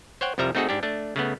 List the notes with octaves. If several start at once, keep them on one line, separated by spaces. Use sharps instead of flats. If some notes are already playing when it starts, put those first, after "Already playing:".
C5 C#5 F#5 G5
C2 F2 F3 G3 E5 A#5
A3 C4 D#4 F#4 G#4 A4
G#2 D4 G4
A3 D4
C#3 A3 B3